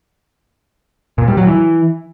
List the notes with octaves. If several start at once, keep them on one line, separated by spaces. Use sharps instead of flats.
A#2
G3
F#3
E3